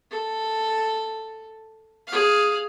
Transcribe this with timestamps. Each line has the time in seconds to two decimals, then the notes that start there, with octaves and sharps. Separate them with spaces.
0.11 A4
2.08 G#4 F5